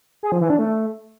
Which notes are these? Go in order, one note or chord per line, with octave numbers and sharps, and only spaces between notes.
G#4
F3
E3
D4
A3